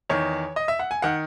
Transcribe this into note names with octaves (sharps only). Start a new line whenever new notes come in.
E2 D#3 C#5
D#5
E5
F#5
G#5
D#3 F#5